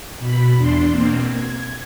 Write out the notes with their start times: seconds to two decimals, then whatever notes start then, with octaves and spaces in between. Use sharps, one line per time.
0.19 B2 B5
0.56 E2 D4 C6
0.90 B2 A#3 C4
1.27 G#6